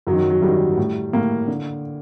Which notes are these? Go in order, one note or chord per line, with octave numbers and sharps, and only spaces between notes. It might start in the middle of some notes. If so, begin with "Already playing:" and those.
F#2 F#3
D#3
F#3
F#3
F#2 D#3 G3
A2
A2 A#3
D3